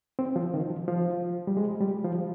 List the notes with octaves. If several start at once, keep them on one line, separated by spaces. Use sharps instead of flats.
C4
F3
D#3
F3
F3
G3
G#3
G3
F3